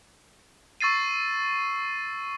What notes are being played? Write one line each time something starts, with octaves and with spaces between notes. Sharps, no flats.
C#6 E6 A6 C7 D#7